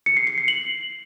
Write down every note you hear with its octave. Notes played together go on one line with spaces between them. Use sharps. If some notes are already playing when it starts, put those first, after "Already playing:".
C#7
C7
C#7
C7
F#7